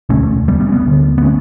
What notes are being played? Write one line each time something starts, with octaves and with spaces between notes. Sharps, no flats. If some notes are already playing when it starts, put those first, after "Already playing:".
E1 D2 D3 A3 C#4
G3 B3
G3 B3
C#4
G3 B3
D2 D3
B3
A3 C#4